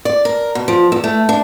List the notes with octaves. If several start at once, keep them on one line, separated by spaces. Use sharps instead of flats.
D5
A#4
B2
F3
E2
A3
D4